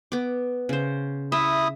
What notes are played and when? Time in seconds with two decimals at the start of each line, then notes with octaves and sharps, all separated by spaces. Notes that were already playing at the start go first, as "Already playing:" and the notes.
0.12 B3 D6
0.69 C#3 C5
1.32 E4 E5 D#6